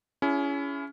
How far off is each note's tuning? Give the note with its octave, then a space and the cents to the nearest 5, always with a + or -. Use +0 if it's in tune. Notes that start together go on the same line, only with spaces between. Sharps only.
C#4 +25 E4 +25 G#4 -10